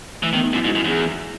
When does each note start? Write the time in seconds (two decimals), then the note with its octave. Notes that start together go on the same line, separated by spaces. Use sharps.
0.22 E3 A3
0.34 D#3 B3
0.44 D#4
0.53 F#2 E4
0.64 G#2
0.69 F#4
0.75 F#2
0.85 E2 G#4